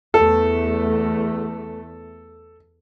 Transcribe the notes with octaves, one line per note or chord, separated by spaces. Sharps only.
E2 A3 A4